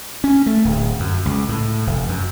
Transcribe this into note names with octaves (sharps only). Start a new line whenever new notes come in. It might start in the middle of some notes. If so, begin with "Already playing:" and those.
C#4
A3
D1
F#2
C#2
A2
F1
F#2